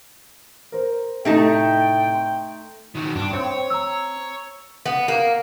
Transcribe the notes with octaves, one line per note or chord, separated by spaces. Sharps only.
A#4 C5
A2 C3 A3 D#4 G5 A5
C6
D#3 F#3
G2 D4
C4 C#5
A#5 E6
B3
A#3